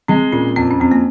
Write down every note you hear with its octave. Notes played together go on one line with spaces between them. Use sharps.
G#3 C4
A#2 C#4
F2 C4
C#4
F2 C4
A#3